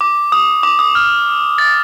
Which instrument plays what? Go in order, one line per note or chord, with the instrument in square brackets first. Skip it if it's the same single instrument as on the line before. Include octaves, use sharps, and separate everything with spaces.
[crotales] D6
D#6
D6
D#6
F6
A6